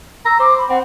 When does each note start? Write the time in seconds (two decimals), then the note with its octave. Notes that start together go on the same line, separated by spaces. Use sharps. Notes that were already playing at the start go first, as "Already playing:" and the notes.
0.25 A#5 E6
0.40 C5 D6
0.58 B5
0.70 C4 F#5